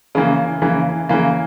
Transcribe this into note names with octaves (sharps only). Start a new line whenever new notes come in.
C#3 E3 A#3
C#3 E3 A#3
C#3 E3 A#3